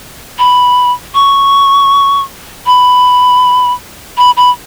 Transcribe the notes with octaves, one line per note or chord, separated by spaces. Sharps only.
B5
C#6
B5
B5
B5